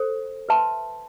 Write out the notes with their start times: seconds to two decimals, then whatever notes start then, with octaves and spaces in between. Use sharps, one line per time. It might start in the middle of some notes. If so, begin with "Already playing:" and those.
Already playing: A4 C5
0.49 B4 E5 A5 C6